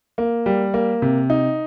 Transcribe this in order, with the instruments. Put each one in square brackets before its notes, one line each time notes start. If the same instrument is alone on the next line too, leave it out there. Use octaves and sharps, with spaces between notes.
[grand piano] A#3
G3
A#3
C3
D#4